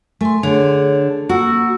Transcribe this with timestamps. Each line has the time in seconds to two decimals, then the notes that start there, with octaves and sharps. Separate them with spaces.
0.21 A3 G#5 C6
0.43 D3 D4 G#4 C#5
1.29 A#3 F#4 E6